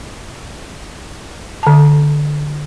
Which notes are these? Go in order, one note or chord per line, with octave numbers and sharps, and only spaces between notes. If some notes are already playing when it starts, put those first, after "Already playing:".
D3 A5